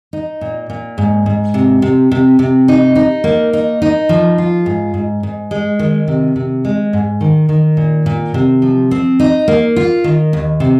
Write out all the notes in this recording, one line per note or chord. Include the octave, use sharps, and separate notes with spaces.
D#4
A#2
A#2
G#2
G#2
C3
C3
C3
C3
D#4
D#4
A#3
D#4
D#4
F3
F4
G#2
G#2
G#2
G#3
D#3
C3
C3
G#3
G#2
D#3
D#3
A#2
A#2
C3
F3
C4
D#4
A#3
F4
D#3
D#2
C3